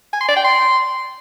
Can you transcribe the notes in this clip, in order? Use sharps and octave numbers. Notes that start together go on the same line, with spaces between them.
G#5
C6
D5
G5
C6